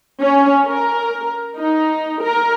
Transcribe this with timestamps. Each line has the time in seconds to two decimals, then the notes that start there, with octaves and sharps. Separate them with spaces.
0.23 C#4
0.68 A#4
1.58 D#4
2.24 A#4